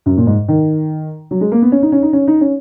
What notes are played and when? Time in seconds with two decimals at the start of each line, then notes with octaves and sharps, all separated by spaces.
0.06 F#2
0.17 A#2
0.27 G#2
0.48 D#3
1.31 F#3
1.41 G#3
1.52 A#3
1.62 B3
1.72 C#4
1.82 D#4
1.92 C#4
2.02 D#4
2.13 C#4
2.28 D#4
2.41 C#4